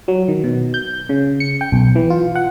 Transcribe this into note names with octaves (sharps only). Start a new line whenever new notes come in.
F#3
D#3
B2
G6
C#3
C#7
G5
B1
E3
F4
F#5